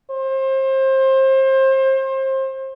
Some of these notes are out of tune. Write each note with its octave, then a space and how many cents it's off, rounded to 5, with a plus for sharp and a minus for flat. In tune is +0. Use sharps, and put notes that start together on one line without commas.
C5 +30